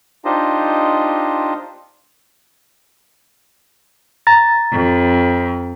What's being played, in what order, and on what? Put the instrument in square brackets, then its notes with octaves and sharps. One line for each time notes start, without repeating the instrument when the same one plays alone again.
[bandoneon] D4 D#4 F4 G4 C5 D#5
[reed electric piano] A#5 A6
[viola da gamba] F2